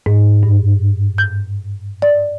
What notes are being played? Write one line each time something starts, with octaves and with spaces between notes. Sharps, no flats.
G#2
G2
G6
D5